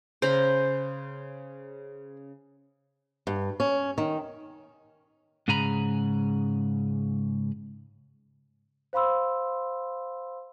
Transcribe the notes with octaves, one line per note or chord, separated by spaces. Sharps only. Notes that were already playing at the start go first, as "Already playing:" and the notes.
C#3 C5 A#5 B5
G2
C#4
D#3
G#2 C#3 G#4 G#5 A#5 B5
C5 F5 B5 C6 E6